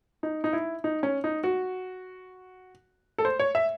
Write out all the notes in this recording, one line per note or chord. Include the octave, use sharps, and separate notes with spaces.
D#4
D#4
E4
D#4
C#4
D#4
F#4
A4
C5
C#5
E5